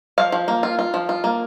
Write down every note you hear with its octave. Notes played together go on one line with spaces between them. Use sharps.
F3 F5
F3
A#3
F4
F4
F3
F4
A#3